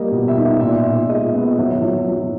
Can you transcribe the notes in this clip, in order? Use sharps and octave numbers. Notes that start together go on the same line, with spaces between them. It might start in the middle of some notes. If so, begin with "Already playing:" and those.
Already playing: G3 A#3 D#5
B2
E5
D#4
E5
A#2 E5
A#2
G#3 D#5
B3
D#5
F#3 E5
F#3
F#3